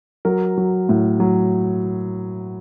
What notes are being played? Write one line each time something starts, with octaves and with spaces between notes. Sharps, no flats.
F#3 A#4
F#3
A2
F#3